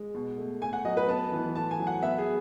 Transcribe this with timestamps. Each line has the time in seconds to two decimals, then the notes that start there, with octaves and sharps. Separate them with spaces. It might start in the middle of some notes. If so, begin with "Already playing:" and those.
Already playing: G#3
0.14 B2
0.38 A3
0.61 A3 G#5
0.73 F#5
0.85 F#3 D#5
0.97 B4
1.08 B3 A5
1.32 E3
1.55 A3 A5
1.71 G#5
1.79 F#3
1.87 F#5
2.02 B3 E5
2.18 G#4